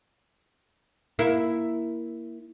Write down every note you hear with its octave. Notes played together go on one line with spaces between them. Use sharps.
A#3 E4